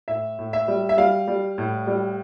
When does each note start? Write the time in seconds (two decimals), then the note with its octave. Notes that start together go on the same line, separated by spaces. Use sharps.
0.08 A2 E5
0.39 A2
0.53 E5
0.68 G3
0.89 E5
0.98 G3 F5
1.28 G3
1.58 A2
1.87 G3